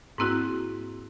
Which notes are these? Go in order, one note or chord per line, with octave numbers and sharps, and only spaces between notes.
G#2 A#3 C4 E4 F#4